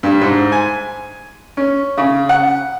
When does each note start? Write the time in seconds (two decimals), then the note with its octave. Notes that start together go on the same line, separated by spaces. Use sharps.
0.03 G2
0.21 G#2
0.52 G#5
1.57 C#4
1.98 C#3
2.29 F#5